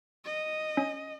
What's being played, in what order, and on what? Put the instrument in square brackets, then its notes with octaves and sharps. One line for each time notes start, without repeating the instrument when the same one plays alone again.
[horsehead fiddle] D#5
[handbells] C#4